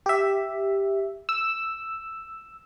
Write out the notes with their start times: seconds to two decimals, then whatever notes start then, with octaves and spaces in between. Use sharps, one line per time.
0.06 G4 E5
1.29 E6